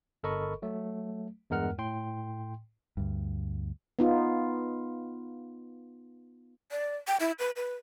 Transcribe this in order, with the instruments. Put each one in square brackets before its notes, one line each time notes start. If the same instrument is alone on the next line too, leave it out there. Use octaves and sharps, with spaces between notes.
[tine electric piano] G1 A4 A#4 D#5 B5 C#6
F#3 A3
E2 G2 G#3 A#4 F#5 F6
A2 G5 C6
[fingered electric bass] D2 G2
[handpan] B3 D#4 F4
[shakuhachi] D5
G5
E4
B4
B4